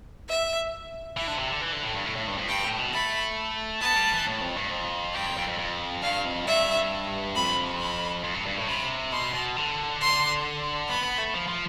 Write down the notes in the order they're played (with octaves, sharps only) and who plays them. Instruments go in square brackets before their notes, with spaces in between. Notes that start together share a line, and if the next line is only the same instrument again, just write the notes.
[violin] E5
[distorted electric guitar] E3 [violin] E5
[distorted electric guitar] D3
C3
D3
E3
D3
A2
G2
A2
A2
G2
F2
[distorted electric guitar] G2 [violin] G5
[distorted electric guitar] A2
B2
[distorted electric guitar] A3 [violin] B5
[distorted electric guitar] B3 [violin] A5
[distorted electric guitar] G3
E3
A2
F2
G2
F2
[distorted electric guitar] G2 [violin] G5
[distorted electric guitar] F2
F2
F2
F2
[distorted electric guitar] G2 [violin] F5
[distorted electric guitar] F2
[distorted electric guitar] G2 [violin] E5
[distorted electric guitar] F2 [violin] B5
[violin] B5
[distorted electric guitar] F2
G2
G2
A2
[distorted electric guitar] C3 [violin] B5
[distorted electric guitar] B2 [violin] C6
[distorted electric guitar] B2
D3
[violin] C6
[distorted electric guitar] B3 [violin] B5
[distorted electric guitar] B3
A3
F3
F3